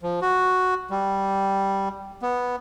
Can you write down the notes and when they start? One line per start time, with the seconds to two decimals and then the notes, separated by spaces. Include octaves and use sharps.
0.03 F3
0.22 F#4
0.90 G3
2.22 B3